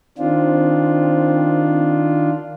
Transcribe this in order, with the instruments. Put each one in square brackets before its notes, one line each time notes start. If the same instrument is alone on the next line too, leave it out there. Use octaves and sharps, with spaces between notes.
[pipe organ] D#3 D4 F4 [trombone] C4